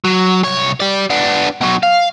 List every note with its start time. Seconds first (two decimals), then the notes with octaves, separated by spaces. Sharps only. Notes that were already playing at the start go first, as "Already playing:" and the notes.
0.04 F#3
0.44 C2 C#5
0.80 G4 D5
1.10 B3 D4
1.61 B2 F#3
1.83 F5